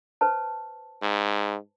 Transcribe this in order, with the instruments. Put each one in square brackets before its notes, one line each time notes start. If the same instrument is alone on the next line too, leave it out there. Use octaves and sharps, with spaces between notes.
[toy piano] B4 C5 A5
[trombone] G#2